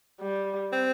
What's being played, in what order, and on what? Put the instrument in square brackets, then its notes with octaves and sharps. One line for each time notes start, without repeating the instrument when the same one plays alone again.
[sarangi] G3
[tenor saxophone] C4